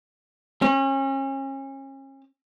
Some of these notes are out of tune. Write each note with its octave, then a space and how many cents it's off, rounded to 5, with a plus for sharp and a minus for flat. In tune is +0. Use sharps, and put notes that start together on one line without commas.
C#4 -35